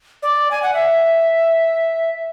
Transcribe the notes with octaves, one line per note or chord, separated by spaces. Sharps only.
D5
G#5
F#5
E5